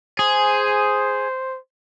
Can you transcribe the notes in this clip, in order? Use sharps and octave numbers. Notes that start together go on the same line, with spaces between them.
G#4 C5